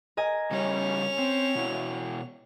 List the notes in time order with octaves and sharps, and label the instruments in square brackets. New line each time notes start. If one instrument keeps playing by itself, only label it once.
[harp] A#4 D#5 G#5
[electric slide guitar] C#3 G3 [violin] C#4 F7
[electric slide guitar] C4
B2 E4 F#4